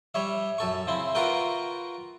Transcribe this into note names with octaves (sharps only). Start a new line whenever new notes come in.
G3 C#5 E5
F#2 A4 C#6
C#3 C4 E4
F4 F#4 A#4 B4 G5